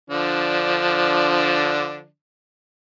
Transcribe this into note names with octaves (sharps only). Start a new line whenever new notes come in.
D3 F3 D4